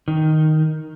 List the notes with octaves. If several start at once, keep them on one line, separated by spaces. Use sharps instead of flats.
D#3